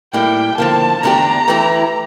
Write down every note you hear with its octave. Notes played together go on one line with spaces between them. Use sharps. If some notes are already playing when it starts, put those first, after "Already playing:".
A2 G3 A#3 E4 G5
D3 F3 A#3 A5
E2 D3 A3 D4 G4 A#5
E3 A3 E4 G4